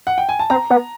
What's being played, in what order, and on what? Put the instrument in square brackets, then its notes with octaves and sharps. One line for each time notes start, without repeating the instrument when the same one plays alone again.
[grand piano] F#5
G5
G#5
A5
[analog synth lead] C4 [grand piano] A#5
[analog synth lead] B3